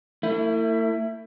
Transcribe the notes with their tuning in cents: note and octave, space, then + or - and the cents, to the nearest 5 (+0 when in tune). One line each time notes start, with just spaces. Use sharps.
A3 +45 E4 +5